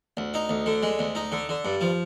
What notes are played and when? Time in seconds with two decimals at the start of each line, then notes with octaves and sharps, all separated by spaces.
0.17 D2
0.34 D#4
0.49 D2
0.66 D3
0.83 G#3
0.99 D2
1.15 D#4
1.32 D3
1.49 D3
1.65 G2
1.81 F3